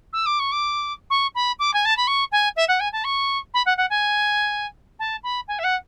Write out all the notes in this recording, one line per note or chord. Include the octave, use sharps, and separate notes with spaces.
E6
D6
C#6
D6
C#6
B5
D6
G#5
A5
B5
C#6
G#5
E5
F#5
G#5
A5
C#6
B5
F#5
F#5
G#5
A5
B5
G#5
E5
F#5